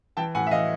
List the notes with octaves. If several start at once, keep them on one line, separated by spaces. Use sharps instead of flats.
E3 G5 A5
A2 F#5 G#5
E5
E3 D#5 F5